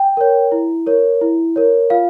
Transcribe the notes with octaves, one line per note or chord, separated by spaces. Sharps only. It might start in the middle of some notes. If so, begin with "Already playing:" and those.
Already playing: G5
A#4 C#5
E4
A#4 C#5
E4
A#4 C#5
F4 F5